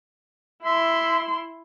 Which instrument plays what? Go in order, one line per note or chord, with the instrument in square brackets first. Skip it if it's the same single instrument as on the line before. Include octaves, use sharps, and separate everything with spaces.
[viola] E4 C6 [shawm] E5